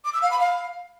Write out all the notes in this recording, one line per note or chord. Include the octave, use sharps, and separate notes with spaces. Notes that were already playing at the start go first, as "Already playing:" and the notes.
D6
E6
F5
B5
F5